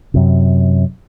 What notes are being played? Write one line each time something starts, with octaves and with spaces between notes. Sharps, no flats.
F#2 C3